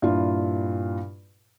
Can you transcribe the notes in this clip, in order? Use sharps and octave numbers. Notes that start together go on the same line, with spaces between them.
G2 A#2 E4 F4